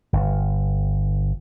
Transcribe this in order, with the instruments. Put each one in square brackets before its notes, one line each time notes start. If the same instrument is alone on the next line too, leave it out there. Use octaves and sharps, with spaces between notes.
[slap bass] G1